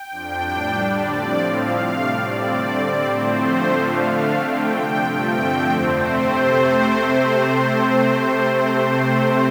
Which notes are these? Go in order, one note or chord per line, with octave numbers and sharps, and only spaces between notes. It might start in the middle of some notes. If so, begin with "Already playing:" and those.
Already playing: G5
F2 F3 D4
A2 G3 D4 G5
D3 G3 D4 D5
A2 F3 C4
A2 F3 C4 F5
C3 A3 D4
A2 G3 C4 D5
D3 A3 C4
D3 G3 C4 D5
A2 F3 A3 C4 C5
D3 F3 A3 C4
D3 F3 A3 D4 F5
D3 A3 D4
D3 A3 C4 G5
C3 F3 D4
G2 F3 A3 C4 G5
D3 F3 A3 C4 G5
F2 D3 A3 C4 C5
C3 A3 C4